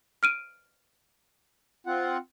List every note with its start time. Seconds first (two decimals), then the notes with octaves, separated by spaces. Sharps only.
0.23 F6 D7 D#7
1.86 C4 F4 F#5